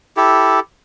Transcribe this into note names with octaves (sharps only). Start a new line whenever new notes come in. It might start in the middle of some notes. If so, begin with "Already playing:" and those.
E4 G4 A4